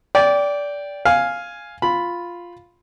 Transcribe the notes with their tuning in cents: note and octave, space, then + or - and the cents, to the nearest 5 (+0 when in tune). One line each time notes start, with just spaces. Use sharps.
D5 -20 G5 +0
F5 +0 G#5 +0
F4 +0 B5 +0